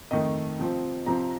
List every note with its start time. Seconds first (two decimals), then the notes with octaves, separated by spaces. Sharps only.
0.11 F2 D#3 A3 D#5
0.59 C3 F3 C4
1.06 C3 F3 C4 A#5